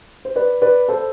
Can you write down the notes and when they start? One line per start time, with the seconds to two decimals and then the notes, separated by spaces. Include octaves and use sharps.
0.25 C5
0.36 B4 D5
0.62 B4 D5
0.88 A4 C5